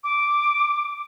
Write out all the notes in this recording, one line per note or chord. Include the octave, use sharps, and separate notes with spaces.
D6